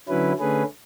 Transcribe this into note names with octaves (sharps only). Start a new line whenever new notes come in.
D3 F#3 C#4 E4 B4
D3 A3 C#4 G#4 B4